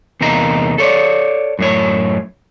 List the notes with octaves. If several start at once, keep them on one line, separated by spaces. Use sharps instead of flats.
E2 C3 A#3 D#4 A#5
A4 C#5 D5
F#2 A2 C#5